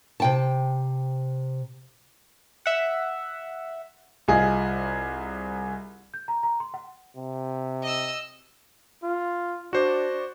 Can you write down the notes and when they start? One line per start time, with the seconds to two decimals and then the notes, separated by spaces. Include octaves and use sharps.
0.20 C3 G5 A5
2.66 E5 F#5
4.28 C2 F4 G#4 D#5
6.14 G6
6.28 A#5
6.43 A#5
6.60 C6
6.74 F#5
7.17 C3
7.83 D#5 E6
9.03 F4
9.73 D4 F#4 C5 D5